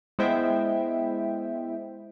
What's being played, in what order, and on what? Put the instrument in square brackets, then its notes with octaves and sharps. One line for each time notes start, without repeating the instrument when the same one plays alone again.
[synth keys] G#3 B3 E4 C5 E5 G5